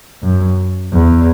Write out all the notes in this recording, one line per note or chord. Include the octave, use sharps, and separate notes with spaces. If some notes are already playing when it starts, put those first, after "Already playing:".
F#2
E2